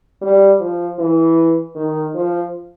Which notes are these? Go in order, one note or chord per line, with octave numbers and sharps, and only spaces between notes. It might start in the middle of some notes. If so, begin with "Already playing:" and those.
G3
F3
E3
D#3
F3